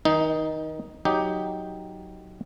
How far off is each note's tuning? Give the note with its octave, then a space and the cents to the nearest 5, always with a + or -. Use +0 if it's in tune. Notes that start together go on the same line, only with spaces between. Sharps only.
D#3 +35 D#4 +5
F#3 +0 D#4 +5 G4 +0